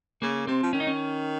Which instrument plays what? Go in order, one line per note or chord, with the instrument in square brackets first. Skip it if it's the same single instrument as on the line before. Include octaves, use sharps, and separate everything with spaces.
[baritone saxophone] C#3 [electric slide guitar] A#3
[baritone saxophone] C3 [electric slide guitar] C4
[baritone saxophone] F3
[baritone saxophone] D#3 [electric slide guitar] C#4
[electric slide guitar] D#4
C#4